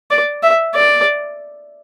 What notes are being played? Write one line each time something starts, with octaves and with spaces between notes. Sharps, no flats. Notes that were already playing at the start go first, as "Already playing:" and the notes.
D5
E5
D5